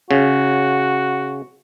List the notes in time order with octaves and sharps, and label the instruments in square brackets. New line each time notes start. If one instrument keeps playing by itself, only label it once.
[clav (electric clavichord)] C#3 [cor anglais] F#4